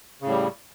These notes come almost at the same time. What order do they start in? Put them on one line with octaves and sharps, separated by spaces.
C#3 A2 G3